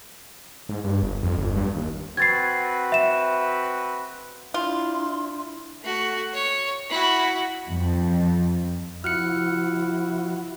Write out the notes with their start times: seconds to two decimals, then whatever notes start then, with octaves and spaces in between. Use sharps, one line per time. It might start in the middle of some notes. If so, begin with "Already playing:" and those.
0.69 G#2
0.84 G2
1.03 G1
1.23 F2
1.37 G1
1.57 G2
1.76 D#2
2.17 C4 F#4 B4 G#6 A6 C7
2.92 E5 E7
4.54 D4 E4 F4 C6
5.83 A3 F#4
6.34 C#5
6.90 E4 F#4
7.71 F2
9.04 F3 E4 F#4 F6 F#6 C#7